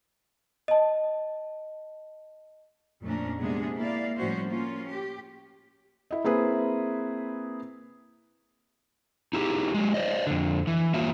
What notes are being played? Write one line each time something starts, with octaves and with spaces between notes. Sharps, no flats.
D#5 A5
F2 A#2 A3 C#4 D4 A#4
C3 G#3 A#3 B3 D4 G#4
A#3 E4 D5 F5
A2 F3 G3 C#4 F#4 C5
A#3 C#4 F4
G4
E4 D#5
A#3 C4 E4 G#4 B4
D#4 E4 G4 G#4
F#3 G#3
C5 D5 D#5
F2 D3
E3
A#3 F4 F#4 E5